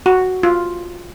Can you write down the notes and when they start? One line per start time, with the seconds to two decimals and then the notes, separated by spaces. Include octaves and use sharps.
0.06 F#4
0.43 F4